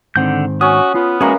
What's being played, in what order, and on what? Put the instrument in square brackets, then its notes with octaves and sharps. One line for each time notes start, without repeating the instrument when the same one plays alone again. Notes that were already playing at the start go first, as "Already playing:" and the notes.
[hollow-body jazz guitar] G#2 D#3 C4 [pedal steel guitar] D3 F#5 G6
[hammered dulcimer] C#4 [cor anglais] F#4 [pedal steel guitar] D#6
[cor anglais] B3 [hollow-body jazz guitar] F4
[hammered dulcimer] E3 A#3 [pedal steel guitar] G#3 F#4 G#4 [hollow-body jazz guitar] C#4 A#5